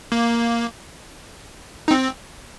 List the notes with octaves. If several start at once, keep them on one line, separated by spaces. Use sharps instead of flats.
A#3
D#4
C4